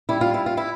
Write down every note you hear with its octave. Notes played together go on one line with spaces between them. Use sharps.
G3 E4
F4
E4
F4
E4